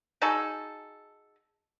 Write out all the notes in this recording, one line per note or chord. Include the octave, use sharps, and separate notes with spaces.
D#4 F#4 G#4 A4